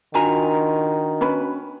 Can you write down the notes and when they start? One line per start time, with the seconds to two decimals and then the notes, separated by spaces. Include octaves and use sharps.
0.14 D#3 D4 F4 F#4 G#5 A#5
1.21 C#4 B4 B5